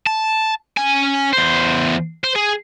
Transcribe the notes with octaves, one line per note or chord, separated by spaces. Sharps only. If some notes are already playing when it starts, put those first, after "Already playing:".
A5
C#4 G#5
E2 C5
C5
G#4